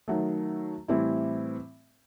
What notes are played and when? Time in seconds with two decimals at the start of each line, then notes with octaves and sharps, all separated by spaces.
0.08 D#3 F#3 A3
0.88 A2 E3 G3 C4 E4